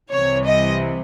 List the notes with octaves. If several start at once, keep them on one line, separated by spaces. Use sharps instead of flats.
C2 C3 E3 C#5
D#5